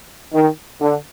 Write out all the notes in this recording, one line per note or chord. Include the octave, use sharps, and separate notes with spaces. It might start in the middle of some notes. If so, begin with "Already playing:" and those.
D#3
D3